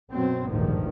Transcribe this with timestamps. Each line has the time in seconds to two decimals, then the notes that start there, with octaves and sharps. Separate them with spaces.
0.12 F#2 B2 F#3 C4
0.49 G#1 D2 G2 A#2 D#3 F3